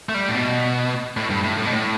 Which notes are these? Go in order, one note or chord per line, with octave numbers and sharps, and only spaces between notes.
A3
G3
A2
B2
A2
G2
A2
A2
B2
A2